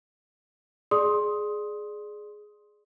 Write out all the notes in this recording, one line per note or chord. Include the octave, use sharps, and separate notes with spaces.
G#4 D5 C6 D#6